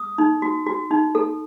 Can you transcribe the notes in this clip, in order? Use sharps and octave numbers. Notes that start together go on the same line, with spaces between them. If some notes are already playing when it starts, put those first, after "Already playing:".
Already playing: D#6
D#4
F#4
F#4
D#4
A4